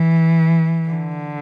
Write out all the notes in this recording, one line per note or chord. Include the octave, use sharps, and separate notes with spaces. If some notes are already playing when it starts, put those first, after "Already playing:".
Already playing: E3
D3